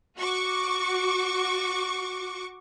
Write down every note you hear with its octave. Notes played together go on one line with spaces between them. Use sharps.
F#4 C#6 D6